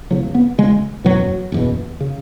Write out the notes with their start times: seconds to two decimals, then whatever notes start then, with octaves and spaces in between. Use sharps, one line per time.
0.10 E1 E2 C#3 F#3
0.35 B3
0.58 E1 E2 C#3 G#3
1.04 F#1 E2 B2 F#3
1.52 F#1 E2 B2
2.01 C#3